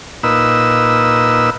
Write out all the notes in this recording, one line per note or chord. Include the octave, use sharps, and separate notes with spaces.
A#2 D#4 B4 E6